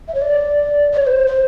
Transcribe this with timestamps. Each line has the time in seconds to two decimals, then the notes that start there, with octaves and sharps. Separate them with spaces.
0.08 E5
0.15 C#5
0.22 D5
0.92 D5
0.97 C#5
1.07 B4
1.11 C5
1.27 C5